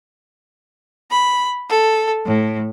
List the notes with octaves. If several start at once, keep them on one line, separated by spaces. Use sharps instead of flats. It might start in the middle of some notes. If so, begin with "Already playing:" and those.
B5
A4
A2